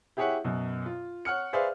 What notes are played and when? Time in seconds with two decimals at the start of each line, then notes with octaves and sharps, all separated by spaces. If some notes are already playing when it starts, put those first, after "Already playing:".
0.17 E4 G4 G#4 C#5 E5 F#5
0.44 F#2 B2
0.86 F4
1.25 C#5 F#5 F6 C#7
1.53 G#4 B4 C5 D5 E5 F5